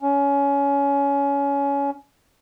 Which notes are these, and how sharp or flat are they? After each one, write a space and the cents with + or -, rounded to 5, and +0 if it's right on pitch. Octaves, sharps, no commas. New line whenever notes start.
C#4 +20